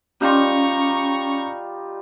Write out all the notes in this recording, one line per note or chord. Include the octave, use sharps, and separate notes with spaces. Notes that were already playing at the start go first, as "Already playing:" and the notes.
G3 C#4 D#4 F4 A#5 C#6